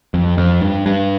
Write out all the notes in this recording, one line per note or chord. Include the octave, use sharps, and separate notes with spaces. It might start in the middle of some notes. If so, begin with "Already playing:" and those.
F2
F2
G2
G2